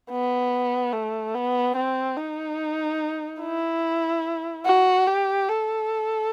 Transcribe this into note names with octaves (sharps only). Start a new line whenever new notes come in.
B3
A3
B3
C4
D#4
E4
F#4
G4
A4